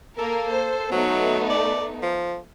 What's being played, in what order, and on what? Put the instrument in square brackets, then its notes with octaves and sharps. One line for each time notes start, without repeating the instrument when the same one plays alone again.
[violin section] A#3 A#4 [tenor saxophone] A4
[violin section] C5
[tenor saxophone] F#3 [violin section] A3 B3 D#4
[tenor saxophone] D5
F3